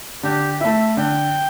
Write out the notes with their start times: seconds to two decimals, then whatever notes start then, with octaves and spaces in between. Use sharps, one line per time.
0.23 D3 G4
0.60 A3 E4 E5
0.97 D3 G5